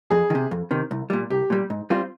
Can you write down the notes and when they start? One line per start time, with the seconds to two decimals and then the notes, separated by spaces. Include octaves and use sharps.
0.10 F2 G#4
0.30 D#3
0.35 C3
0.51 F2
0.71 C3 D#3
0.91 C2
1.10 A#2 G3
1.30 C2 G4
1.50 A#2 G3
1.70 G#2
1.90 G3 C4 F4 C5